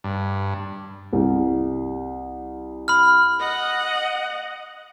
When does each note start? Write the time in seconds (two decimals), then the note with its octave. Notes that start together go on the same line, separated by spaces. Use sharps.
0.04 G2
1.13 C2
2.88 B5 F6
3.40 D#5 F#5